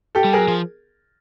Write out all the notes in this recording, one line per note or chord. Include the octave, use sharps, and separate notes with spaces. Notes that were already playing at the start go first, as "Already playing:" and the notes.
G4 A4
G3
F#3 G#4 A#4
F3